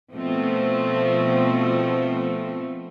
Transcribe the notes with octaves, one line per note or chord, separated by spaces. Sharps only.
B2 F3 A3 C4